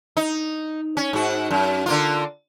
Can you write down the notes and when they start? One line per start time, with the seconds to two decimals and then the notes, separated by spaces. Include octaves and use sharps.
0.17 D#4
0.97 C#4
1.13 G#2 F#4
1.51 F#2
1.86 D3 A#3 F4